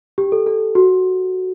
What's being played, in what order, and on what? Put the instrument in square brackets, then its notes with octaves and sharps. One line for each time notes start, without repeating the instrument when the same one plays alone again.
[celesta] G4
A4
A4
F#4